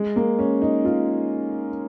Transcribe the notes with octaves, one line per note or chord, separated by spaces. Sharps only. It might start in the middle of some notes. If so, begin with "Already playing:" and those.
Already playing: G#3
A#3
C#4
D#4
F4